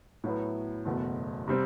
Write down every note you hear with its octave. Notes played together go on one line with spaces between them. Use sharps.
A2 F#3 B3 E4
F#1 E2 B2 A3
C3 G3 C4